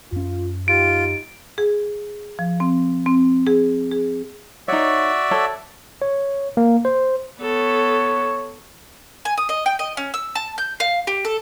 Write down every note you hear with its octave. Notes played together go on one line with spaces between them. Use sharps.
F#2 C#4 F4
D#4 F4 G4 D7
G#4
F3
C4
C4
G#4
G#4
D#4 F#4 C#5 D5 E5
A4 C#5 A5
C#5
A#3
C5
B3 A4 C#5
G#5
D#6
D#5
G5
D#5
C#4
E6
A5
G6
F5
G4
A4